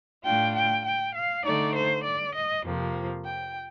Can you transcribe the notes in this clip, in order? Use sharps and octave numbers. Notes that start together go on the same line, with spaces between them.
A2 A3 D4 F4 G5
G5
G5
F5
D3 A3 D#4 D5
C5
D5
D#5
F2 C3 F3 A#3
G5